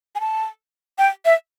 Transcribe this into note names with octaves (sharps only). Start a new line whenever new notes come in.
G#5
A5
G5
E5